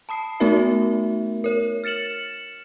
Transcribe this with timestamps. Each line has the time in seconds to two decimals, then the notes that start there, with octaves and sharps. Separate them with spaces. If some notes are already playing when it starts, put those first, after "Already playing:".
0.09 A5 B5 D#6 C7
0.40 A3 B3 D#4 F#4 A#4 E5
1.44 A#4 C#5
1.84 F6 A6 C#7 E7 F#7